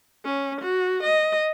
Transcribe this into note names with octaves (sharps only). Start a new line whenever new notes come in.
C#4
F#4
D#5